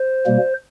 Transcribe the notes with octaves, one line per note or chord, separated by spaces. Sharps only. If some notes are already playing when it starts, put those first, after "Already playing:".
Already playing: C5
B2 G3 A#3